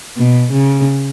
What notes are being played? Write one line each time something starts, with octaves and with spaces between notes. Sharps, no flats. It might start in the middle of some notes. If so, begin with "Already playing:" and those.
B2
C#3